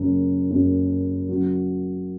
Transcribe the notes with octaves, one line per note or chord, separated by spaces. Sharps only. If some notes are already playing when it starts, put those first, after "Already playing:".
Already playing: F#1 F#2 C#3
F#1 F#2 C#3
F#2 C#3 F#3